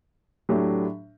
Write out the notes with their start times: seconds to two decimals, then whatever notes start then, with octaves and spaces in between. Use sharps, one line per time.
0.49 A2 F#3 A3 D4 G4